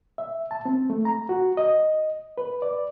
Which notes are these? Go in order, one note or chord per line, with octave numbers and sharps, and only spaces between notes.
E5
A5
C4
A3
A#5
F#4
D#5
B4
D5